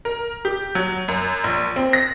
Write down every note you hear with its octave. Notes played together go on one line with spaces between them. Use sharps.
A#4
G4
F#3
F#2
A#1
C4
A#6